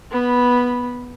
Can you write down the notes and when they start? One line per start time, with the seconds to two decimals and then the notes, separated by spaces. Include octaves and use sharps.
0.11 B3 B5